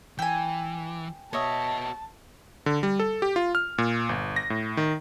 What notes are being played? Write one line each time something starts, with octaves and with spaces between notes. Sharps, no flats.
E3 G5 G#5
B3 F#4 C#5 D#5 E5 A5
D3
G3
A4
G4
F4
F6
A#2
G1
A#6
A2
D#3